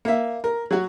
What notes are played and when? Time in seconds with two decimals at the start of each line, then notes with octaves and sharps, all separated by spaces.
0.05 A#3 E5
0.44 A#4
0.71 F#3 F#4